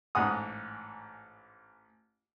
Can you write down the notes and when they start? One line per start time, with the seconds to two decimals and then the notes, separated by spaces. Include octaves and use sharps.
0.15 A1 G#2 F#5 D#6